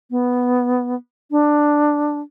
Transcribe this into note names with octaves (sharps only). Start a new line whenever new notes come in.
B3
D4